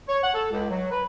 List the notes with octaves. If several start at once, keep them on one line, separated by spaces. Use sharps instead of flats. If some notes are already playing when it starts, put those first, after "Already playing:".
C#5
F#5
A4
C#2
F#3
B4